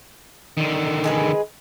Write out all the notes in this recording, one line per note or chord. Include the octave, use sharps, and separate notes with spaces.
D3 D#3
G#3 G#4 B4